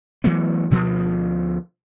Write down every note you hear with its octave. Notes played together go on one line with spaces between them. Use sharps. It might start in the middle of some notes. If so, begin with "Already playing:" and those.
E3 F#3 A3 B3
D2 B2 F3